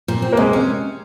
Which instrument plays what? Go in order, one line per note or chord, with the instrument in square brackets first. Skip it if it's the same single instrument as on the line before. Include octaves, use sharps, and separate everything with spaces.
[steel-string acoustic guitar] A#2
C4
[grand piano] A#3
[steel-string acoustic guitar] C3 [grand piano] G#3
[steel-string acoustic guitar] C#4